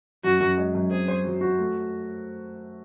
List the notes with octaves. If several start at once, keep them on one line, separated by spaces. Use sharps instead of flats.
F#2 F#4
F#2
G#3
F#2
C4 G#4
C5
F#3
F#4
A3